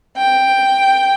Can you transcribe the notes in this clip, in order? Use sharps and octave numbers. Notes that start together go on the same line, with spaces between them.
G5